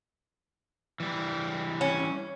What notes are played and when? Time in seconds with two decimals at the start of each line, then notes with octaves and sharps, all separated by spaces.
1.00 E3 G3
1.81 C#4